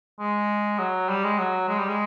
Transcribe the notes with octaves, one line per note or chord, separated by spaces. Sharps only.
G#3
F#3
G3
G#3
F#3
G#3
G3
G#3